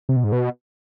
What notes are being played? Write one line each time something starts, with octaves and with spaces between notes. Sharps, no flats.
C3
B2
G#2
B2